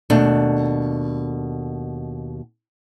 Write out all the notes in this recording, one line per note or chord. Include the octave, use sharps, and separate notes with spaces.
D#2 B2 A3 D4